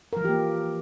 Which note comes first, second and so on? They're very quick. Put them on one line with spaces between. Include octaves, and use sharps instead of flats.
A#4 F3 E3 G4 A#3